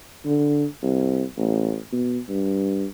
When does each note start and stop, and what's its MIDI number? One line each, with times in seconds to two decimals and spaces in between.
0.25 0.66 50
0.83 1.24 36
1.38 1.78 33
1.92 2.19 47
2.29 2.87 43